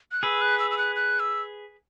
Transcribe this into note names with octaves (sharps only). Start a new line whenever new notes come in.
F#6
G#4 B4 E6
F#6
E6
E6
F#6
F#6
E6